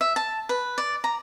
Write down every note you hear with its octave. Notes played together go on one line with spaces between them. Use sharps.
E5
A5
B4
D5
A#5